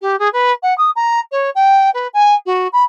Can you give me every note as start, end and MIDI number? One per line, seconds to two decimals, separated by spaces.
0.01 0.16 67
0.19 0.29 68
0.33 0.52 71
0.63 0.76 78
0.78 0.90 87
0.96 1.20 82
1.31 1.50 73
1.55 1.90 79
1.94 2.07 71
2.13 2.34 80
2.46 2.67 66
2.72 2.84 83